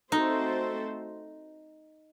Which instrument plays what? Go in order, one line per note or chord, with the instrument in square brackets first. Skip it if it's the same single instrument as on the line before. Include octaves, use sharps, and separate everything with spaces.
[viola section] A3 C4 F#4 A4 C5 [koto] D#4